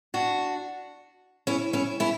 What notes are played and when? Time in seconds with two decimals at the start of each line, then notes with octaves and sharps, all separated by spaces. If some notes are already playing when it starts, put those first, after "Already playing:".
0.14 D4 F#4
1.47 C#4 E4
1.73 C#4 E4
2.00 C#4 E4